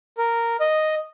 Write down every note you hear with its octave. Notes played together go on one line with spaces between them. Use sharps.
A#4
D#5